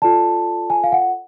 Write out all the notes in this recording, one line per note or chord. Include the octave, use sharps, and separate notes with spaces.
F4 A4 D5 A5
G#5
F5
F#5